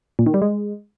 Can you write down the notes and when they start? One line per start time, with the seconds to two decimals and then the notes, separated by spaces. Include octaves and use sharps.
0.19 A#2
0.26 D#3
0.34 G3
0.42 G#3